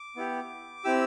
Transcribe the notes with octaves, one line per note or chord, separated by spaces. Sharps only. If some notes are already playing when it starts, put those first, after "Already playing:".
Already playing: D6
B3 E4 G4
C4 E4 G4 E6